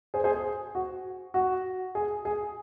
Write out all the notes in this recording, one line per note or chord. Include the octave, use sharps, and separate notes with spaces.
G#4 C5
G#4 C5
G#4
F#4
F#4
G#4
G#4